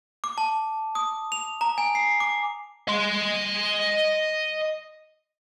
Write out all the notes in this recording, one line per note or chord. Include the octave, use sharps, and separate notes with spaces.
D6
A5
D#6
F7
A#5
G#5
C7
D6
D#5 C6